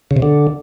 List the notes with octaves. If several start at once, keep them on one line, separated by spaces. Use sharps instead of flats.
C#3
C3
D3